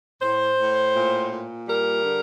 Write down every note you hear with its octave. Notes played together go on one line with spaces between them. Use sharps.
A2 C5
A2
A#2
A#2
G3 A#4
D3